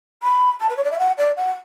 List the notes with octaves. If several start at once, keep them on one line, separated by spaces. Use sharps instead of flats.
B5
A5
B4
C#5
D5
E5
F#5
D5
F#5